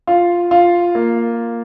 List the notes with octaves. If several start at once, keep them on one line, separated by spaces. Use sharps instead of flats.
F4
F4
A#3